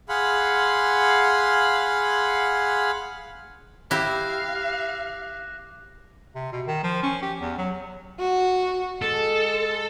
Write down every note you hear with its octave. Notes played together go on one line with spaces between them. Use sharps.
G#4 F5 F#5 B5 C6
E4 G4 F5 D6 F#6 A#6
C3
B2
D#3
F3
C#4
G4
E2
F#3
F#4
G#3 A4